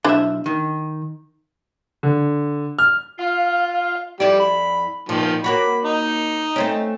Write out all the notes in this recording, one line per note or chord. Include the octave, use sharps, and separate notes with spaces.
B1 D4 E4 C5 E5
D#3
D3
F6
F4 F5
F2 G3 E4 D5
B5
A#2 D#3 F3
A#3 F#4 C#5 B5
D#4
A3 C4 C#4